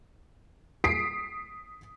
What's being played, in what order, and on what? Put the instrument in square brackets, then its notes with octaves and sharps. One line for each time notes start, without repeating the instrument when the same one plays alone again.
[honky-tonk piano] D#6 B6 C7 D7